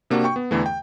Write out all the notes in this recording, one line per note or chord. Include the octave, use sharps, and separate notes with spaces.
C3 A#3 D4 F#4
G5 C#6
B3
E2 D3 E3 A3
G5